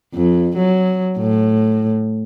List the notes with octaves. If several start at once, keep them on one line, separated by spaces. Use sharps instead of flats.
F2
F#3
A2